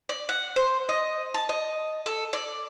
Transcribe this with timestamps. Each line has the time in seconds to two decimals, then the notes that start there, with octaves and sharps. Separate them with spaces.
0.09 D5
0.29 F#5
0.56 C5
0.89 D#5
1.34 A5
1.49 D#5
2.06 A4
2.33 D5